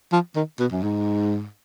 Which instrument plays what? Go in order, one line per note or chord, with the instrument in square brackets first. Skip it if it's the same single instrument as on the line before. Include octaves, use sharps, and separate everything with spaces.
[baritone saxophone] F3
D#3
B2
F#2
G#2